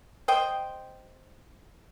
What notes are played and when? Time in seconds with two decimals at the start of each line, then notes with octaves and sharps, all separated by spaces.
0.28 C5 D#5 G5